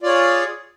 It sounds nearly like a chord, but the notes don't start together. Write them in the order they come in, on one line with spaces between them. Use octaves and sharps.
F4 D5 C#5 G#4